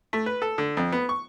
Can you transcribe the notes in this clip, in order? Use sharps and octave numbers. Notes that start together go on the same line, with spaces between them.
A3
B4
A4
D3
F2
B3
C#6